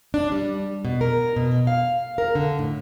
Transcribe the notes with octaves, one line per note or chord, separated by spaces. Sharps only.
D4
G3
B2
A#4
B2
F5
A#4
D3
A2